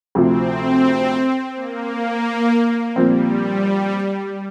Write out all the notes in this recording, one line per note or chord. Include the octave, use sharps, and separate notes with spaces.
D2 C3 F3 C4
A#3
A#2 F3 G3 C4